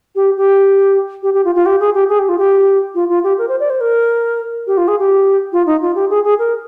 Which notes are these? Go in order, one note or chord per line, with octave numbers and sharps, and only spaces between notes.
G4
G4
G4
G4
F4
F4
G4
G#4
G4
G#4
G4
F4
G4
F4
F4
G4
A#4
C5
D5
C5
A#4
G4
F4
G#4
G4
F4
D#4
F4
G4
G#4
G#4
A#4